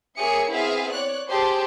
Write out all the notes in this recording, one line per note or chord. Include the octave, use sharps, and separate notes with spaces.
A#3 G#4 C#5 E5 C#7
B3 C4 E4 G#4 E5 F5
C#5 D5 F#6
G4 G#4 C5 A5